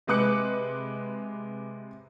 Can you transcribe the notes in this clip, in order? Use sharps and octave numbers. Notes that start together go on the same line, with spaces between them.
C3 G#3 B4 D6 F#6 C#7